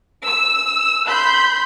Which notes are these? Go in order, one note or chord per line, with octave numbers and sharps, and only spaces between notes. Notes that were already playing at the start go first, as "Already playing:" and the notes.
E6
B5 C6 G6